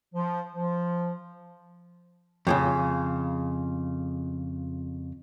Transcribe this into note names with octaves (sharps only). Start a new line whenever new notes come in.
F3
F3
F2 A#2 C#3